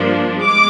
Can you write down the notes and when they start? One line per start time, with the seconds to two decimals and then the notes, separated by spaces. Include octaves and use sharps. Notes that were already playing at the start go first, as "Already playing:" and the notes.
Already playing: G2 F3 A#3 D4
0.40 G#3 D6